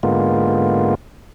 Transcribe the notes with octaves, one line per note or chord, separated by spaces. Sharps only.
G#2 D3 G#3 A#3 B3 F4